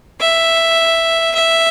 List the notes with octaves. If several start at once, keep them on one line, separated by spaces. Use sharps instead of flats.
E5
E5